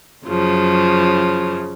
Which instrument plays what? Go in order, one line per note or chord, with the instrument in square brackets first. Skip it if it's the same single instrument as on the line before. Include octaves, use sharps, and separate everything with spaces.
[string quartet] F#2 C#3 F3